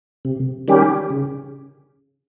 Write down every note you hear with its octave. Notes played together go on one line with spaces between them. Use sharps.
C3
D#3 G3 C#4 G4
C#3